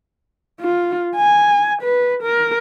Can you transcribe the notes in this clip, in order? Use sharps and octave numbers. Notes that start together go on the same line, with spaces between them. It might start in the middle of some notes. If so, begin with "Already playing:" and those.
F4
G#5
B4
A#4